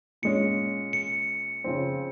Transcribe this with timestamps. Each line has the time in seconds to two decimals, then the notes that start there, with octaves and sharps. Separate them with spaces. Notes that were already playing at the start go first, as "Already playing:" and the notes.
0.22 A#2 G#3 C#4 C#7
0.93 C#7
1.64 C#3 F3 C4